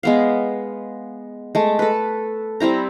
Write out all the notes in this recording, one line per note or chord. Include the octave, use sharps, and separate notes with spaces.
G#3 B3 F5
G#3 A3
A4 B4
G3 C4 E4 A#5